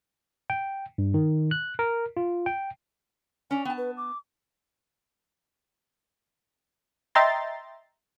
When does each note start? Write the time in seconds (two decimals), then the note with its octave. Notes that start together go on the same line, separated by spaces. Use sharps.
0.50 G5
0.98 G2
1.14 D#3
1.51 F#6
1.79 A#4
2.17 F4
2.46 G5
3.51 C#4 D4 G#5
3.65 B3 G5 A5
3.78 B4
3.97 D6
7.15 D#5 E5 G5 A#5 C6 A6